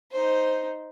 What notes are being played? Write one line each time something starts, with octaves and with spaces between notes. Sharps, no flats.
D#4 C5